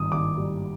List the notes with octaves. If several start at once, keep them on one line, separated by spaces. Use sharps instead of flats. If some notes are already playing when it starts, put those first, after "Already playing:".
Already playing: G#1 G2 D#6
G#1 D6
G3